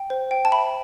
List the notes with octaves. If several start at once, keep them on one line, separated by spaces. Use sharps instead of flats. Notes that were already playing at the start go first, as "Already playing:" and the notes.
Already playing: G5
C5
G5
A5
E5 B5